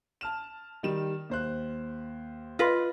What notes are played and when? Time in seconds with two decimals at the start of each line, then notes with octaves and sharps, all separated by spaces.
0.21 A5 F6 E7
0.83 D#3 G3 E7
1.29 D#2 C5 F#6
2.59 F4 B4 D#5 C6 A#6